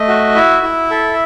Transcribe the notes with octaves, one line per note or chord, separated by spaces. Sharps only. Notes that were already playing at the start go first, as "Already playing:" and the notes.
Already playing: A3 D#5
F#4
E4 E5
E4
A4